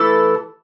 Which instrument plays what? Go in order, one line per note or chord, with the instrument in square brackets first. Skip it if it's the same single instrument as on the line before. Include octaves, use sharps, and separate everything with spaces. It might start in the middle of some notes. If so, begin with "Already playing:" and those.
Already playing: [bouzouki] E3 A3 E4 A4